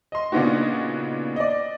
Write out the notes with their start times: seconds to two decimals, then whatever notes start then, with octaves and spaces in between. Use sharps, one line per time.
0.12 D#5 C6
0.32 A#2 C#3 B3 D4 D#4 F#4
1.36 D5 D#5